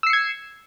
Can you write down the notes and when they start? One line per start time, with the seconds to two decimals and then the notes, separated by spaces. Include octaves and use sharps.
0.03 E6
0.07 C7
0.10 C#7
0.13 G#6